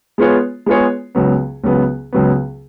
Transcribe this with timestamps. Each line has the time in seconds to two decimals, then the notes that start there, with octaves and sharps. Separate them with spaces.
0.18 G#3 B3 F4 G#4 C#5
0.66 G#3 B3 F4 G#4 C#5
1.15 C#2 C#3 F#3 B3
1.64 C#2 C#3 F#3 B3
2.12 C#2 C#3 F#3 B3